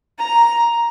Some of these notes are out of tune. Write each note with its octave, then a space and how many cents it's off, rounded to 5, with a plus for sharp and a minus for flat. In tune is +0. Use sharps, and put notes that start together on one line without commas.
A#5 +5